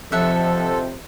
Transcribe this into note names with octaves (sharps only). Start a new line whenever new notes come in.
F2 C3 F3 A4 C5 E5 F#5